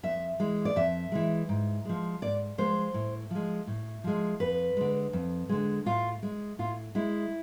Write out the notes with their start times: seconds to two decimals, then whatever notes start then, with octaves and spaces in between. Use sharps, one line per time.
0.03 F2 E5
0.40 E3 G#3
0.65 D5
0.76 F2 E5
1.12 E3 G#3
1.49 G#2
1.85 F3 G#3
2.21 G#2 D5
2.58 F3 G#3 C5
2.94 A2
3.31 F3 G#3
3.67 A2
4.04 F3 G#3
4.40 F2 B4
4.77 D3 G#3
5.13 F2
5.49 D3 G#3
5.86 A2 F4
6.23 G#3
6.59 A2 F4
6.95 G#3 E4